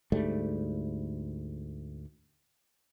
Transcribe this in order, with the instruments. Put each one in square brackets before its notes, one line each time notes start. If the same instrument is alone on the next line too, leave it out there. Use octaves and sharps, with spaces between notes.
[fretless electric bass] D2 G#2 G3 A3